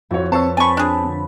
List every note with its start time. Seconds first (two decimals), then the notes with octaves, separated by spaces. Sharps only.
0.11 F2 E4 F#4 C#5
0.32 C4 B4 C#5 A5 C#6 E6
0.57 C4 G#5 A5 B5 C#6
0.77 D4 G#4
1.04 D3